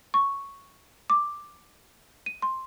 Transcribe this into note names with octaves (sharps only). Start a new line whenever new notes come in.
C#6
D6
D#7
C6